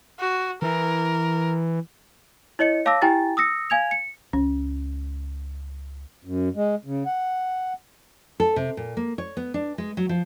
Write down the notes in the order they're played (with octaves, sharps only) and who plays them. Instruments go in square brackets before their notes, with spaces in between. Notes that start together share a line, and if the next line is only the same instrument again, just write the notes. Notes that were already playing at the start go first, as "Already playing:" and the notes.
[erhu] F#4
[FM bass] E3 [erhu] A#4
[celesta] E4 C#5 D#5 C#7
C#5 F5 A5 D6 E6 A#6
E4 G4 G5 G#5 A#5 A6
D#6 E6 A#6 C#7
F5 G#5 G#6 F7
C#7
[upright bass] C#2 [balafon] C#4
[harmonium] F#2
G#3
C#3
F#5
[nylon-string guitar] A4
C3
A#2
A#3
C#5
B3
D4
G#3
F#3
F3